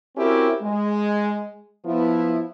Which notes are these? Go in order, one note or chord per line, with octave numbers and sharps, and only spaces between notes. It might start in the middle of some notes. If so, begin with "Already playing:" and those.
C4 C#4 E4 F#4 G4 A#4
G#3
F3 B3 E4